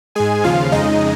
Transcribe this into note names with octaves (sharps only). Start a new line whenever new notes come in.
G#2 G#3 G#4 G#5
D#2 C#3 F3 F4 F5
F2 C#3 G#3 D#4 D#5